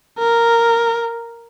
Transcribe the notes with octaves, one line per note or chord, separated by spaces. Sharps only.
A#4